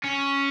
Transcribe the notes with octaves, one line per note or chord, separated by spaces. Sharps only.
C#4